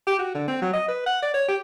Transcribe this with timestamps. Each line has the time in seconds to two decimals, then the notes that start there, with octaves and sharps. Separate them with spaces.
0.07 G4
0.19 F#4
0.35 D3
0.48 C4
0.62 F#3
0.74 D#5
0.88 B4
1.06 F#5
1.23 D5
1.34 C#5
1.48 G4